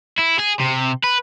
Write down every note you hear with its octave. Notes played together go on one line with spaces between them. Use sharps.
E4
G#4
C3
B4